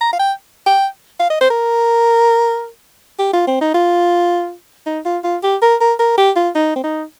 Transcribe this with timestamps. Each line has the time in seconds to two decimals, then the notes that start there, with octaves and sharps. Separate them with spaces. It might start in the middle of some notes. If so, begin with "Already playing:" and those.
0.01 A#5
0.13 F5
0.19 G5
0.67 G5
1.20 F5
1.30 D#5
1.41 C5
1.50 A#4
3.19 G4
3.33 F4
3.47 C4
3.61 D#4
3.74 F4
4.87 D#4
5.05 F4
5.24 F4
5.43 G4
5.62 A#4
5.81 A#4
6.00 A#4
6.18 G4
6.36 F4
6.56 D#4
6.76 C4
6.84 D#4